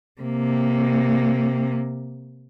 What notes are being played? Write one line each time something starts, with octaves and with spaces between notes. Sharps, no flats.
C3 A#3